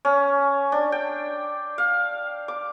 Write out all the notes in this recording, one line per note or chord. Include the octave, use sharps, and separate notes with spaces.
C#4
D4
G5
F5
D6